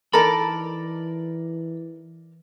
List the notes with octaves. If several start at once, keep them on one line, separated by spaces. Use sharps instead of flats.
E3 D#4 A4 A#4 D5 A5 B5